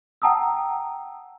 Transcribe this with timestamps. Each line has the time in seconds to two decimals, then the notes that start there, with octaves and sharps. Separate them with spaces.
0.22 F#5 G5 A5 A#5 D#6 E6